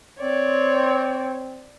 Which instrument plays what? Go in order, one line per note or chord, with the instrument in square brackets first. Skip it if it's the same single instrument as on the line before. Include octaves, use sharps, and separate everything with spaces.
[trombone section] C4 [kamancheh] C#5 [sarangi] D5